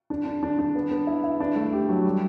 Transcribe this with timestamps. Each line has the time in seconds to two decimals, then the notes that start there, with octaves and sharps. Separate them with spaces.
0.10 D4
0.25 D4
0.43 D4
0.59 D4
0.75 B3
0.91 B3
1.07 E4
1.24 E4
1.40 D4
1.56 A3
1.73 G4
1.89 F#3
2.05 G3